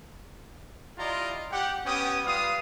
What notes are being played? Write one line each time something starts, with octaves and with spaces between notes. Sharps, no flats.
E4 F4 G4 D5 D#5 A#5
G4 F#5
B3 C#4 G4 G5 D#6
G3 F4 B4 F5 D#6